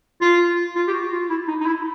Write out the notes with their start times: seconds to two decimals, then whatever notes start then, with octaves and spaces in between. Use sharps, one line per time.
0.21 F4
0.76 F4
0.88 G4
0.93 F#4
1.12 F4
1.30 E4
1.48 D#4
1.61 D#4
1.66 E4